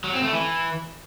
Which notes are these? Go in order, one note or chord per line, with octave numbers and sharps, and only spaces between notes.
F#3
C4
A3
E3